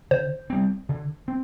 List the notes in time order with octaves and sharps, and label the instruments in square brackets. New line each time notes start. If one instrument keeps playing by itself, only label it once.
[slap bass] D3 [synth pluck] C5
[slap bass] G3 C4
D3
C4